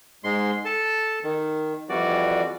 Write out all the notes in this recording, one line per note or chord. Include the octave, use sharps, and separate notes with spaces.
G#2 G#3 C6
A4 A5
D#3
F2 E3 G3 F#4 D5